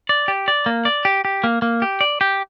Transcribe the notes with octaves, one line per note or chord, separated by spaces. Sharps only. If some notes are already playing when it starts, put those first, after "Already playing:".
D5
G4
D5
A#3
D5
G4
G4
A#3
A#3
G4
D5
G4